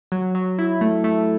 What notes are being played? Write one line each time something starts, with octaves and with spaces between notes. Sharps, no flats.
F#3
F#3
E4
A3
A3